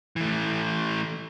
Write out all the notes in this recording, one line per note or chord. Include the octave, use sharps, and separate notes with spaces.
E3 A3